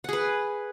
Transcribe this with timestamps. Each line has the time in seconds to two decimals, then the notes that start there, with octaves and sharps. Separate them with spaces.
0.04 F#5
0.09 G#4
0.13 B4